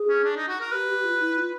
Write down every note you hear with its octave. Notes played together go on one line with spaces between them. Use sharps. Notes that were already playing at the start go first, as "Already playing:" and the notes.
Already playing: G#4
C#4
D4
D#4
F#4
A#4
G4 B4
G4
F4
E4
F4